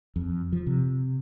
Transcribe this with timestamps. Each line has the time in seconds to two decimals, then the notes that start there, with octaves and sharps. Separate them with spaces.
0.16 F2
0.52 F3
0.67 C3